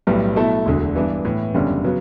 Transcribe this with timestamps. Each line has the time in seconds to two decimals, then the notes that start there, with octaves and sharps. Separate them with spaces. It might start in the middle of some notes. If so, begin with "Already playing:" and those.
0.07 B1 A2 G3 B3
0.36 B2 F#3 A3 E4 A4
0.66 E1 D2 D3
0.95 G2 E3 B3 D4
1.25 A2 E3 B3
1.54 F#1 E2 D3 G3 C#4
1.84 C#3 F#3 B3